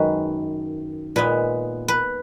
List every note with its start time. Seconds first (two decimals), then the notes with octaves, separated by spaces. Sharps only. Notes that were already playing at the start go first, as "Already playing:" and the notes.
Already playing: F#2 D#3 G#3 B4
1.16 A#2 G#3 B3 B4
1.88 B4